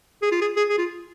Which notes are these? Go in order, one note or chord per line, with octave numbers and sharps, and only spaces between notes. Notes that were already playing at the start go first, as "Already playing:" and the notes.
G#4
F4
G#4
G#4
G#4
F4